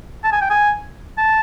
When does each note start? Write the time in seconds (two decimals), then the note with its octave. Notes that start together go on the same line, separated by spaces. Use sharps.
0.24 A5
0.32 G#5
0.41 G5
0.50 G#5
1.18 A5